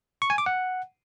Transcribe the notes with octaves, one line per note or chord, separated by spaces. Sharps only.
C#6
G#5
D6
F#5